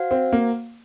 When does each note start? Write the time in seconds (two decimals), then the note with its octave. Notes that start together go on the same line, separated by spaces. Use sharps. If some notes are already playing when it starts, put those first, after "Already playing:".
Already playing: F#4 C5 F5
0.11 C4
0.33 A#3